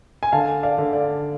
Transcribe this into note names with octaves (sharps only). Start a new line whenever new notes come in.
G#5
D3 F5 A5
D5 F5
D3
D5 F5